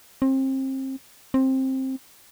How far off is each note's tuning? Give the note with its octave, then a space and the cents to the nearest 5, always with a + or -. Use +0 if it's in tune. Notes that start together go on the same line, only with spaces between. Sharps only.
C4 +30
C4 +15